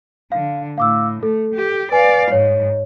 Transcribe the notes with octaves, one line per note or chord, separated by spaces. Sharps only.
D3 F5
A2 F5 D6 E6
A3 A4
G4
B4 D5 F5 G#5
G#2 C#5